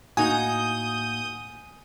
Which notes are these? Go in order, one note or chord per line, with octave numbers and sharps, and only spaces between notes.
A2 A#3 D#4 F#4 G#5 D#6 G6